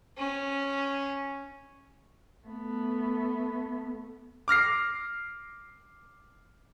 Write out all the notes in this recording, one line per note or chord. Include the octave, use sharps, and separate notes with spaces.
C#4
A3 B3
D6 F6 A#6 C7